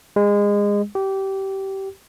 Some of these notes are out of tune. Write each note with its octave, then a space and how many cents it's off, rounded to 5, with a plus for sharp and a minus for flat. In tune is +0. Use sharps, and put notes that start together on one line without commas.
G#3 -25
G4 -20